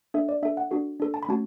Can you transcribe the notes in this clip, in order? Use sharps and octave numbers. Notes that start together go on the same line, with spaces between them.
D4 A4 E5
D5
D4 A4 E5
F#5
D4 F#4 A4
D4 A4
A5
B5
A3 C#4 F#4 A5